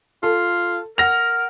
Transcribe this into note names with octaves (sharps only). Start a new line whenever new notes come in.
F4 A4
A#4 F#5 A#6 F7